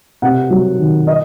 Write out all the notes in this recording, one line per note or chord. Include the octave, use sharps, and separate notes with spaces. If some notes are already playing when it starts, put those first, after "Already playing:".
C3 F#5
F#3
D#3
D#5